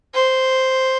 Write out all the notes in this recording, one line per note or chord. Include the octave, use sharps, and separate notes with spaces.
C5